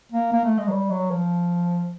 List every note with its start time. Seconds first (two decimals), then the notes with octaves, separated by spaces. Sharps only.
0.12 A#3
0.32 A#3
0.44 A3
0.58 G#3
0.67 F#3
0.72 G3
0.90 F#3
1.11 F3